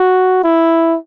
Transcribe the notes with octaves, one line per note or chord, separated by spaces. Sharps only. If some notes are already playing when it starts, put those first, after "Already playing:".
Already playing: F#4
E4